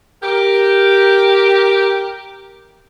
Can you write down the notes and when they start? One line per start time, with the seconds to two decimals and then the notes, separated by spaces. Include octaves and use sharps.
0.23 G4 A#4